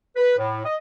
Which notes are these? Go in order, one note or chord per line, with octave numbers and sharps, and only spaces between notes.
B4
A2
D#5